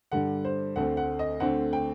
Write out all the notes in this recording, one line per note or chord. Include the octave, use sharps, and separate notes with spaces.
G2 D3 G3 F#5
C5
D2 D3 A3 C4 F#5
F#5
D#5
D2 D3 A3 C4 F#5
G5